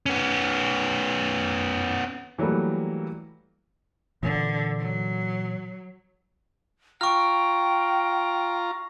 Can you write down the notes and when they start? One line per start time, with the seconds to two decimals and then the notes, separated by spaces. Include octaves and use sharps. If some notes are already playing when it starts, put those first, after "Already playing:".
0.06 B3 C#4
2.38 E3 F#3 G3 A3 A#3
4.23 A#2 D3 E3
4.79 F#3
7.01 F4 G5 A#5 C#6 F6